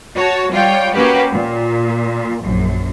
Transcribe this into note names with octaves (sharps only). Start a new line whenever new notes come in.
F#4 C#5 A5
G3 F4 C#5 G5
A#3 C#4 F#4 G4 B4
A#2
A#1 F#2